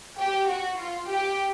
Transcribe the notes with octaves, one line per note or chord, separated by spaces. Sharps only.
G4
F#4
F4
G4